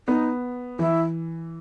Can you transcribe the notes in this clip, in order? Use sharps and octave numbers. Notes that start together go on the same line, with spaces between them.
B3 D#4
E3 E4